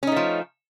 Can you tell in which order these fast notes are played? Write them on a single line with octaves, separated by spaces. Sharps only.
C#4 D#4 A3 F3